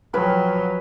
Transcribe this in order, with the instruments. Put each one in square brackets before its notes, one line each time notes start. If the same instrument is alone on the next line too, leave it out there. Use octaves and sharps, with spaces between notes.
[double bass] F3 F#3 [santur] G#4 F5 G5 [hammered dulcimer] B4